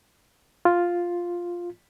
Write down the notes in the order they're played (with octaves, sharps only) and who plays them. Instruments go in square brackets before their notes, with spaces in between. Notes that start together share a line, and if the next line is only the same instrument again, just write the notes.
[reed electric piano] F4